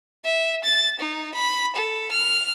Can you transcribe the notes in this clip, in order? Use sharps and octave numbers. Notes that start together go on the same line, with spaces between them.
E5
A6
D#4
B5
A4
F6